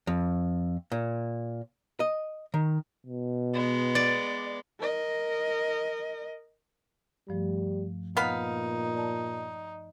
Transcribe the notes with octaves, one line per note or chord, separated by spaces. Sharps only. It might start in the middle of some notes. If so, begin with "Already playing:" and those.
F2
A#2
D#5
D#3
B2
G#3 B3
D5
A#4 D#5
G2 F3 G3 A3
A#2 B3 D#4 F5 B5
D5 A5